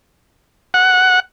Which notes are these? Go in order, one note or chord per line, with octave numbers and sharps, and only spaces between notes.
F#5